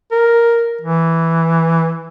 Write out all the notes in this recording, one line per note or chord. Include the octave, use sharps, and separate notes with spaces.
A#4
E3